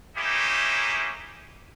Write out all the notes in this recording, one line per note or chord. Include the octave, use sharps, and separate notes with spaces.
A3 A#3 C#4 D#4 E4 G4